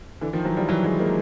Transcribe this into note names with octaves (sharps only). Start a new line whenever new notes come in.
D3 E3
D#3 F3
E3 F#3
F3 G3
E3 F#3
F#3 G#3
G#3 A#3